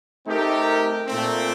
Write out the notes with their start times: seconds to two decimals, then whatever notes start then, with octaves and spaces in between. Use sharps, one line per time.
0.25 A3 C4 D#4 G4 A#4
1.07 A#2 A3 C4